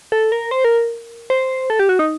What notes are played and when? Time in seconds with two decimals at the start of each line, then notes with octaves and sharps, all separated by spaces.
0.12 A4
0.32 A#4
0.51 C5
0.64 A#4
1.30 C5
1.70 A4
1.79 G4
1.89 F#4
1.99 D#4